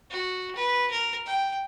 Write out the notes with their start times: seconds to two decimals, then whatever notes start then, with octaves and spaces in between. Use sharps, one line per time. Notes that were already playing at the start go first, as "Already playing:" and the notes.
0.10 F#4
0.55 B4
0.91 A#4
1.26 G5